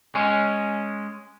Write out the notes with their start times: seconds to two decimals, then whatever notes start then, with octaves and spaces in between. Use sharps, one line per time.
0.15 G#3 C#4